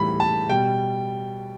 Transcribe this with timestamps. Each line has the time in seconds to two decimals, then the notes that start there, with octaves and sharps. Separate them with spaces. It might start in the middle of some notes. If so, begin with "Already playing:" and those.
Already playing: A2 E3 G3 B5
0.20 A5
0.49 B2 G3 G5